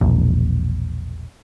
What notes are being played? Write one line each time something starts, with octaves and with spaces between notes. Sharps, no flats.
E1 A#1